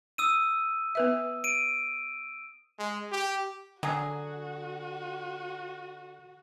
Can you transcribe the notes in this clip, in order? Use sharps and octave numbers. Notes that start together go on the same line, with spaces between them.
D#6 E6 D#7
B3 B4 E5
D7 D#7
G#3
G4
D3 F#3 F#4 G#4